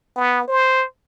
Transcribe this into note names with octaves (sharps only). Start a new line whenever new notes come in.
B3
C5